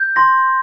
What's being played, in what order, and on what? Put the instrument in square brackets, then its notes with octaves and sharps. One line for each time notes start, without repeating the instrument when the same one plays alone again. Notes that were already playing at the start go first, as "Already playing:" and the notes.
Already playing: [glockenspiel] G6
C6 A#6